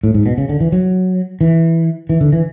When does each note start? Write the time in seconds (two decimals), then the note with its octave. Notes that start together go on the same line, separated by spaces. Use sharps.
0.04 A2
0.14 G#2
0.26 B2
0.38 C#3
0.49 D3
0.61 E3
0.72 F#3
1.41 E3
2.09 E3
2.21 D3
2.33 E3